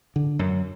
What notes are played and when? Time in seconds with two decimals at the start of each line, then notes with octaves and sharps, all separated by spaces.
0.16 D3
0.39 F#2